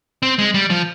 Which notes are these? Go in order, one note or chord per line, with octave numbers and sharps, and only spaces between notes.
C4
G#3
G3
F3